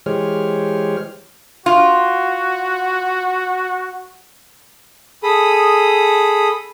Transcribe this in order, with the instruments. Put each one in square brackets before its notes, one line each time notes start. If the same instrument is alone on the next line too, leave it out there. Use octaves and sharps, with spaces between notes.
[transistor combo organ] E3 G#3 G4 C5 C#5 F6
[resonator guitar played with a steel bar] F4 [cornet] F#4
[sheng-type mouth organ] G#4 A4 B5 D#6